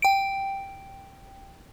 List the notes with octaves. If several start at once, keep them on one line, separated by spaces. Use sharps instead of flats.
G5 D7